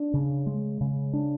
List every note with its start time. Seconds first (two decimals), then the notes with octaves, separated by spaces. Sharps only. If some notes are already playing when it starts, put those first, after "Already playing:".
Already playing: D4
0.14 C#3
0.46 G#3
0.81 C#3
1.13 D4